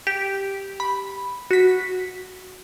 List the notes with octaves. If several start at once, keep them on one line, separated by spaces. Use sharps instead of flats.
G4
B5
F#4 B6